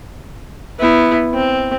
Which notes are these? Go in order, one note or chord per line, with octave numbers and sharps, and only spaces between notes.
B3 E4
C4